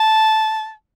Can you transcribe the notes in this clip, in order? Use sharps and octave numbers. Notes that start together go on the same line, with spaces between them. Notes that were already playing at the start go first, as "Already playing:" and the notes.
Already playing: A5